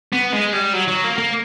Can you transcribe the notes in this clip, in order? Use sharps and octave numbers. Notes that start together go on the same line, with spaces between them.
B3
G#3
G3
F#3
F#3
A#3
A#3